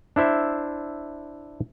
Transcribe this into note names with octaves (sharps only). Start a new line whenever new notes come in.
D4 E4 C5 E5